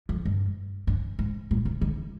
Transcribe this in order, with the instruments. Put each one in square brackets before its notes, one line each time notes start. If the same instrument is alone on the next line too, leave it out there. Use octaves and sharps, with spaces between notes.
[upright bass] F2
G2
G2
G#2
A#2
C3
D3